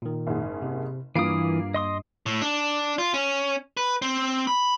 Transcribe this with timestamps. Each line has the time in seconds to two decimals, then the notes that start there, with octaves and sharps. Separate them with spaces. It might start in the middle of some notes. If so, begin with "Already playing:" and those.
0.02 A#2 D#3
0.27 F#1 G#2 G#4
0.62 C3
1.16 G2 E3 A#3 F4 D#6 C7 D7
1.74 D#5 C6 D#6
2.26 A2
2.42 D4
2.98 F4
3.14 C#4
3.77 B4
4.02 C4
4.47 B5